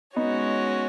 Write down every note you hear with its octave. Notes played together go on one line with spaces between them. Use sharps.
G#3 B3 C#4 D#4 F#4 C#5